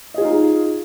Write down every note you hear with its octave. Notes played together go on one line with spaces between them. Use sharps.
D#4 F4 G#4 D#5